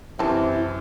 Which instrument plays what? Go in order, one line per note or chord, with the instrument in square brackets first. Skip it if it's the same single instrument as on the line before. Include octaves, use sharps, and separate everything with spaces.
[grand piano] F#2 E3 [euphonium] C3 [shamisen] C4 A5 [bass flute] E4